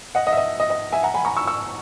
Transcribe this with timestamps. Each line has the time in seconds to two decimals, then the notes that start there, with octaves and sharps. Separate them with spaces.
0.15 D#5 F#5
0.27 D#5
0.32 E5
0.37 D#5
0.60 D#5
0.70 D#5
0.92 E5 G#5
1.03 F#5 A#5
1.14 G#5 B5
1.25 A#5 C#6
1.37 C#6 E6
1.47 C#6 E6